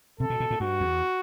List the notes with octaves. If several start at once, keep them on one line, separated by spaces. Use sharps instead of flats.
C3 A4
B2
B2
A2
G2 F#4
E2